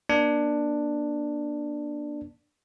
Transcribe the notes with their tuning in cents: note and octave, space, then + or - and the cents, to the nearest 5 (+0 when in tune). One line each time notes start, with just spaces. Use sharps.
A#3 +45 D4 +10